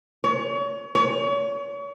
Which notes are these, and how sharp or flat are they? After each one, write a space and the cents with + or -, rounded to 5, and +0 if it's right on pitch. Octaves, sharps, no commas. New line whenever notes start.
C#5 +35
C#5 +35